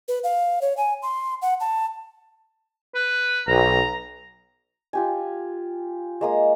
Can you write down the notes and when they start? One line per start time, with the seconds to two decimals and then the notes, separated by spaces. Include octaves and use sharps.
0.08 B4
0.24 F5
0.62 C#5
0.77 G#5
1.02 C6
1.42 F#5
1.60 A5
2.95 B4
3.48 B1 A#5
4.93 F4 G4 G#5
6.21 G#3 A#3 D#6